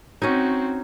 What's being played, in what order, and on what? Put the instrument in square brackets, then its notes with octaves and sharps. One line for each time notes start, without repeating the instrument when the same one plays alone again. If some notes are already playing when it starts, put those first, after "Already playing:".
[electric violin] C4 F#4 [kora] C#4 D#4